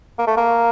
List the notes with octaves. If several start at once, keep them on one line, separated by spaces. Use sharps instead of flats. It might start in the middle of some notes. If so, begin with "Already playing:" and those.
A#3
A3
A#3